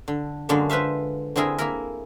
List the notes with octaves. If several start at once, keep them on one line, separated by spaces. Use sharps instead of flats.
D3
F#2 D3 F#3 G#3 A#3 A5
F4 B4 C5 E5 F5
D3 C4 E4 G#4 A#4
A#3 E4 A#4